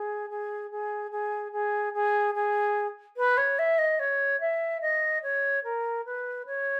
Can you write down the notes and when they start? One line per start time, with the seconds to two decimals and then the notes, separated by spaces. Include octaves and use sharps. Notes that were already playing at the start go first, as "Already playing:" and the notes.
Already playing: G#4
0.29 G#4
0.70 G#4
1.10 G#4
1.52 G#4
1.93 G#4
2.34 G#4
3.16 B4
3.37 C#5
3.58 E5
3.78 D#5
3.99 C#5
4.40 E5
4.81 D#5
5.22 C#5
5.64 A#4
6.05 B4
6.46 C#5